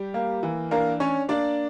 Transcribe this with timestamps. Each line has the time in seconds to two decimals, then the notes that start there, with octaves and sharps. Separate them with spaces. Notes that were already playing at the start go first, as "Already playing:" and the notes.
Already playing: G3 G4
0.14 A#3
0.43 E3
0.71 A#3 D4 A#4
1.00 C#4 D4 C#5
1.28 A#3 D4 D5